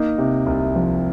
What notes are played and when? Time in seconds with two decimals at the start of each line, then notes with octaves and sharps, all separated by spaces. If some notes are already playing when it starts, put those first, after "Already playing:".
Already playing: A#3 D#4
0.18 C3
0.46 C2
0.76 F3